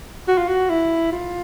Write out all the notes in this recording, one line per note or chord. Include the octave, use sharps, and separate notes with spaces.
F#4
F4
F#4
E4
F4